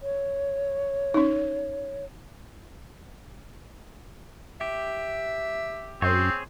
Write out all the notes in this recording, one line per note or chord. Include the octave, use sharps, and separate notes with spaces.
C#5
C#4 D#4
G4 E5
F#2 C4 G#4 C5 C#5